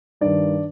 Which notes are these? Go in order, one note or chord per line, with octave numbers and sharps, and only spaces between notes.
G2 D#3 D4 D5